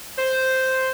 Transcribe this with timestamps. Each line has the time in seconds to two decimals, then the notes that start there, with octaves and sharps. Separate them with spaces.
0.17 C5